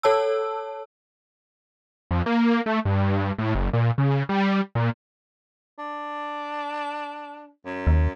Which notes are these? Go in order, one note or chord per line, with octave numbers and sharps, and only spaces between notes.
A4 C#5 A5 E6
F2
A#3
A3
G2
A2
F#1
A#2
C#3
G3
A#2
D4
F#2
D#2